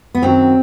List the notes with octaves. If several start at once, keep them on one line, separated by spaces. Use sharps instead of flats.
B3
F#2 D#3 F#3 C4